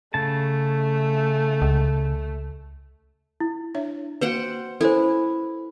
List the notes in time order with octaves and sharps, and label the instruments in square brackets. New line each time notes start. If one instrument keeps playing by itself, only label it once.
[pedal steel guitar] C#3 A5 [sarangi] A3
[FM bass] C#2
[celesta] E4
[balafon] D4 C#5 E5
[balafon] A#3 F#4 [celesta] B4 [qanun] C5 F#5 G5
[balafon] C#4 B4 G#5 [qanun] E4 [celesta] A4 C5